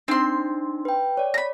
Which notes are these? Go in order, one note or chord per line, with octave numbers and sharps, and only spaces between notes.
C4 D4 D#4 C6
B4 G5
C#5 D5
A#5 B5